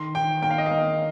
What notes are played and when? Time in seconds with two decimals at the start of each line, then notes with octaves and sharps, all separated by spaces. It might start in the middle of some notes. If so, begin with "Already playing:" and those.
Already playing: D#3 C6
0.15 D#3 G5
0.42 A#3 G5
0.51 F5
0.58 D#5
0.66 A#3 F5